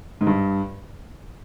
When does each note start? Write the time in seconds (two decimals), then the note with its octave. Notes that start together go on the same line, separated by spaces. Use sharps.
0.21 G#2
0.27 G2